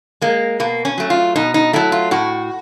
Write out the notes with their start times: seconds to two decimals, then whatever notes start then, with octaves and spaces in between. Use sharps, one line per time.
0.21 G#3 A#3
0.60 B2 A#3
0.85 C#4
0.98 F#3 A3
1.10 F4
1.36 B2 D#4
1.54 D#4
1.73 F#3 A3 E4
1.92 F4
2.11 A2 F#4